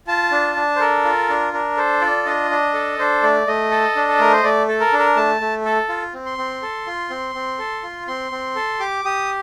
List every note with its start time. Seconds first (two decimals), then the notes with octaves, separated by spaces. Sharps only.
0.07 F4 A5
0.32 D4
0.56 D4
0.76 C5
0.80 A4 A#4
1.04 F4
1.29 D4
1.53 D4 A#4
1.77 A4 C5
2.01 F4 D5
2.26 D4 D#5
2.50 D4
2.74 A4
2.99 D4 C5
3.23 A3 D5
3.47 A3 D#5
3.71 A4
3.96 D4
4.08 A4
4.20 A3 A#4
4.33 C5
4.44 A3 D5
4.68 A4
4.80 A#4
4.93 D4
4.99 A#4
5.16 A3 A5
5.41 A3
5.65 A4
5.89 F4
6.14 C4
6.26 C6
6.38 C4
6.62 A4
6.87 F4
7.10 C4
7.35 C4
7.59 A4
7.83 F4
8.07 C4 C6
8.32 C4
8.55 A4
8.80 G4 D6
9.04 G4 D#6